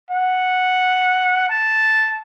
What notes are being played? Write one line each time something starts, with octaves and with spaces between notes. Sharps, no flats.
F#5
A5